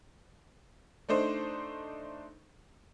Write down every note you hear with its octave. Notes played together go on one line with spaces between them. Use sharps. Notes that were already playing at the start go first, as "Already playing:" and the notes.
A3 D4 D#4 C5